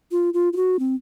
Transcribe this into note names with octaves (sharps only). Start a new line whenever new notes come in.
F4
F4
F4
F#4
C4